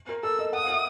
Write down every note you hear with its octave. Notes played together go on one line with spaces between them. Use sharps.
A#4
A4 E6
D#5
F#5 D#6
F5
E5